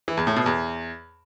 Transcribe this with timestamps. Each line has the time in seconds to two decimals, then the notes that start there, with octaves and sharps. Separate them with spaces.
0.08 E3
0.17 E2
0.27 A2
0.36 B2
0.46 E2